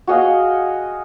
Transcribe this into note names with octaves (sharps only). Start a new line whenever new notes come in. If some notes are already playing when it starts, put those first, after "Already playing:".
F#4 G#4 D#5 F5